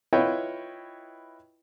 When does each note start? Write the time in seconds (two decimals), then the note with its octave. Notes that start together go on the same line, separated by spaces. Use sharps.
0.13 E4 F4 B4 C#5 D#5 G5